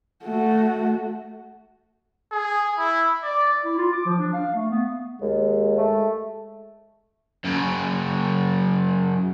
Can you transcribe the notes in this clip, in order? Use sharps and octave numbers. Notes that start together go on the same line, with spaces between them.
A3 F#4
G#4
E4
D5
E4
F4
D6
F3
D4
F5
A3
B3
D#2 G#3
A3
F#2 C#3